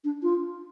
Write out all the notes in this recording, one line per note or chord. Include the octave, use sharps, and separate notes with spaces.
D4
F4